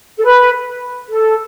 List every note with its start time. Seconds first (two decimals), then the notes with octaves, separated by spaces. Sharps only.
0.18 A4
0.24 B4
1.08 A4